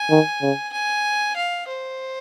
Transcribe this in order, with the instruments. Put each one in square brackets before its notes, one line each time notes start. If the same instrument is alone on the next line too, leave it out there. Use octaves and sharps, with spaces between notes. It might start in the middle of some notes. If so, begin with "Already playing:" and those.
Already playing: [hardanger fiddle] G#5
[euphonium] D#3
C#3
[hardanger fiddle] G#5
F5
C5